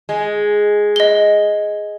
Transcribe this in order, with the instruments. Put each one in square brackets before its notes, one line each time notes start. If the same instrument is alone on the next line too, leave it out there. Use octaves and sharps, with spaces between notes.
[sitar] G#3
[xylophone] D#5 G7